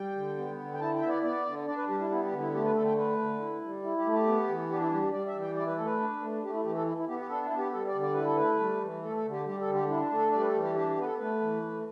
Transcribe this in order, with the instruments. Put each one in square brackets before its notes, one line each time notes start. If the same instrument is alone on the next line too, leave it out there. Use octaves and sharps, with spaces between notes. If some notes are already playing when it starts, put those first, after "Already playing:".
Already playing: [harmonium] G3 G5
D3
B3
D3
G5
E4 A5
G5
B3 E5
D5
B3 D5
D3
D4 D5
B4
G3 G4
E4
B3 E4
G4
D3
E4
A3 G4
B4
D3 A4
G5
A3 B4
D3
E4
G3
E4
G4
A3
G4
B3
E3
D4 G4
E4
G3 G4
G4
G3 D5
E5
E3
G5
E4 D5
B4
A3 A4
B4
D4
A3
A3 G4
E4
E3 G4
A4
E4
E4
B3 G4
G4
D4 A4
E4
B3
G4
G3 A4
D5
D3
D5
E4 B4
A4
A3 B4
G3
E3
A3 A4
A4
D3
G4
G3 G4
A4
D3
G4
D4 E4
A3
A4
G3 D5
B4
A4
E3
G4
D4 G4
G4
B3 B4
A4
A3 B4
E3
A3